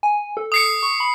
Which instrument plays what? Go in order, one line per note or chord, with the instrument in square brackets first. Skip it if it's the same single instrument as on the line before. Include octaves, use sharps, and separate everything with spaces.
[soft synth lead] G#5
A4
[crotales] D#6 C7 C#7
[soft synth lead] C#6
B5